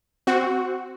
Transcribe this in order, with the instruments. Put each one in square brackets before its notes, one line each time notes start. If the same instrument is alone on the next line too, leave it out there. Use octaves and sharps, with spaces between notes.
[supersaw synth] C4 F#4